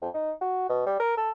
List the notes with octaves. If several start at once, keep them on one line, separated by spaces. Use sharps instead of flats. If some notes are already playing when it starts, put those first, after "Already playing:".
F2
D#4
F#4
B2
G3
A#4
A4